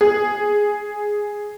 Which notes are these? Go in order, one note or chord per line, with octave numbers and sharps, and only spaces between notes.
G#4